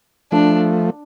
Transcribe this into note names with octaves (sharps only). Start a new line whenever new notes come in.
F3 A3 D4